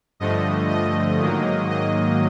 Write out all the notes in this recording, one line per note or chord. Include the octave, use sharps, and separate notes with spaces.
G2 D3 F3 A3 D#5
D#5
G#2 D#3 F#3 A#3
D#5